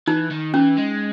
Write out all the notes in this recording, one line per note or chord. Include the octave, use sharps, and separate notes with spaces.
E3 D#4
D#3
E3 C#4
G#3